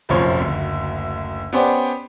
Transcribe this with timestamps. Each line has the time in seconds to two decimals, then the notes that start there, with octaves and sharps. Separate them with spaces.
0.09 F1 A#1 F#2 F3 C5 C#5
0.39 F#1 D2
1.53 B3 C#4 G4 C5 D5 F#5